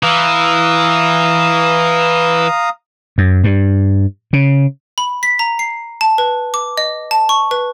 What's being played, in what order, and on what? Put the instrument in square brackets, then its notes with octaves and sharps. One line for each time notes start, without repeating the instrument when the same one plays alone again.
[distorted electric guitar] E3 [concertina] F5 A#5 D#6
[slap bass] F#2
G2
C#3
[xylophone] B5
B6
A#5
C7
A5
B4
D6
D#5
A5
C#6
B4